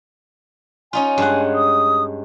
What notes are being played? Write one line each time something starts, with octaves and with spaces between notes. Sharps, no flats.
C#4 D#4 F4 G#5
G2 G#3 F#5
D#6